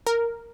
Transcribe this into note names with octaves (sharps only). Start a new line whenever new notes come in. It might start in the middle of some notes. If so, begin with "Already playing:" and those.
A#4